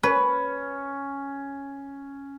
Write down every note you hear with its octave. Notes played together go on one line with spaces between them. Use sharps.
C#4 B4